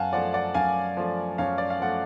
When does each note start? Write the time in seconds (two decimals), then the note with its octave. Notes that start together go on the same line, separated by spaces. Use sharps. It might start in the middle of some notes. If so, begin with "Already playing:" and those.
Already playing: F#2 F5 F#5 G#5 A5
0.13 F3 A3 D5 F#5
0.34 D5 F#5
0.54 F#2 F5 G#5
0.97 F3 A3
1.38 F#2 C#5 F5
1.58 D5
1.70 F5
1.80 F3 A3 F#5